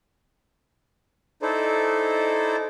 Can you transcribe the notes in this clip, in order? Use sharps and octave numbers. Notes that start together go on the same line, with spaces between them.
D#4 E4 A4 C5 D5